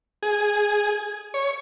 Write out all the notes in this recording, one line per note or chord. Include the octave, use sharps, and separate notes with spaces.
G#4
C#5